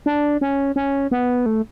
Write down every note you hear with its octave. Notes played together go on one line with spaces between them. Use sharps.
D4
C#4
C#4
B3
A3